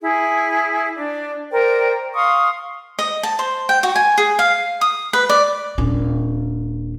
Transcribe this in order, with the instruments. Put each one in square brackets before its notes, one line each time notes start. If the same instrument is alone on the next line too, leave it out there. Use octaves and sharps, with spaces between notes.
[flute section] E4 G#4
D4 D5
A#4 C5 D5 G5
F5 C6 C#6 D#6
[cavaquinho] D#5
A5
C5
G5
F#4
G#5
G#4
F5
D#6
B4
D5
[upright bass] D#1 D4